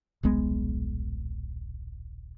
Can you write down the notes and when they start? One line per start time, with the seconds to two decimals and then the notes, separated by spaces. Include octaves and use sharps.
0.23 D#1 B1 G#3 B3